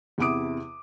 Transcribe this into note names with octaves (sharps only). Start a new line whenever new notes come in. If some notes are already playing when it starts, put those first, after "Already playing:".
E2 C3 E4 D6 D#6 D7